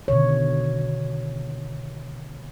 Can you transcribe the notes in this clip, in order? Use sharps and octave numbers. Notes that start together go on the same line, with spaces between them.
B2 D3 D#3 C#5